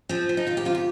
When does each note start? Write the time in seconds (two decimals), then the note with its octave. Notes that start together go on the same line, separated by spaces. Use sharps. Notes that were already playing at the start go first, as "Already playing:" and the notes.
0.09 F3 C4
0.29 F3
0.37 D#4
0.47 D#3 F4
0.57 G4
0.65 C3 F4
0.75 G4